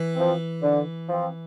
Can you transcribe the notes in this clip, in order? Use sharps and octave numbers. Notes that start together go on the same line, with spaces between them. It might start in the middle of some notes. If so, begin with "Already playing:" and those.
Already playing: E3
F3 C4
D3
F3 C4